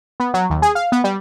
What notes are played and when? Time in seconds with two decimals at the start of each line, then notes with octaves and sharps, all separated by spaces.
0.20 B3
0.34 F#3
0.50 D#2
0.62 G#4
0.75 F5
0.92 B3
1.04 G3